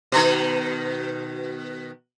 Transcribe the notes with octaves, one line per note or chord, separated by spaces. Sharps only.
B2 D#3